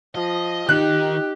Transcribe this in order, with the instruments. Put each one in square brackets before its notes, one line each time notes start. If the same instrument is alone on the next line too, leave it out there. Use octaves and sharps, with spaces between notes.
[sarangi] F3 [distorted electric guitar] D#5
[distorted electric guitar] D#3 [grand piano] D#4 F#6 [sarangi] G4